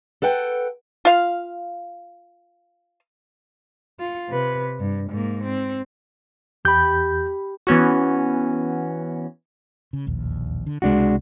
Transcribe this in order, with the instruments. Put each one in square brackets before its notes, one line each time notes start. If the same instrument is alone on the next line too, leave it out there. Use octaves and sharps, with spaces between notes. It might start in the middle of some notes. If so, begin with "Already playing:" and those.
[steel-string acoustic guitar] A4 B4 F#5 G5
[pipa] F4 F5
[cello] F4
C3 B4
G2
G#2 A#3
C4
[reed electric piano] E2 G6 [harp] G4 B5
[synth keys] E3 B3 C#4 F#4
[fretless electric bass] C#3
E1 A#1 D#2
D3
[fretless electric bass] C#2 C3 [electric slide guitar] G#3 D4 F#4